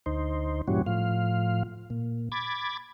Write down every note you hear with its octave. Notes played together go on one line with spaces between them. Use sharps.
D2 D#4 C5
G2 A#2 E3 G3 C#4 F#4
A2 F3 F5
A#2
B5 D6 G#6 A6